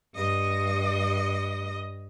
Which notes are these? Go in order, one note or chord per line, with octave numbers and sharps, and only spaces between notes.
G2 D#5